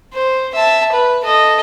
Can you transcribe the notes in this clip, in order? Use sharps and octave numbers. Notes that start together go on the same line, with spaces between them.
C5
E5 A5
B4
A4 D#5